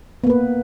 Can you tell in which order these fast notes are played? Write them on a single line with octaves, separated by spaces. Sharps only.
B3 A#3 B4